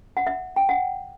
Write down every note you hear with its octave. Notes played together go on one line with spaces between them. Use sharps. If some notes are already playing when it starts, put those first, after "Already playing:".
F#5
E5
G5
F#5